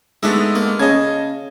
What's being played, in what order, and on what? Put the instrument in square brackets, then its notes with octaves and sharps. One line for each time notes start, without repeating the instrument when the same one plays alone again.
[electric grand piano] G#3 A3 B3 [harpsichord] D4 D#4 E5
[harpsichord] A#3
[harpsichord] C#3 [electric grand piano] D#5 A5 G#6